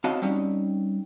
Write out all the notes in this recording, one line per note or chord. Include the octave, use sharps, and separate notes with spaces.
C4 F#4 C#5 D#5 F5 A5
G3 C4 C#4 D#4